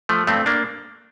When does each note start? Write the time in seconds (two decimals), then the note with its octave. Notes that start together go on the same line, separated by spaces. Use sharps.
0.09 F3 A3
0.27 G2 A3 C4
0.46 A#3 D4